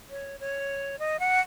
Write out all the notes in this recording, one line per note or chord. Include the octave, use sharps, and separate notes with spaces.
C#5
C#5
D#5
F#5